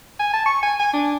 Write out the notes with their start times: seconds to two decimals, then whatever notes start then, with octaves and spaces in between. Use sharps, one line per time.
0.19 G#5
0.33 A5
0.46 C#6
0.63 G#5
0.80 G#5
0.93 D4